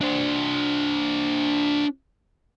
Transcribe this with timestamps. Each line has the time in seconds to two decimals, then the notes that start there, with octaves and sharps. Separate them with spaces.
0.01 D4 C5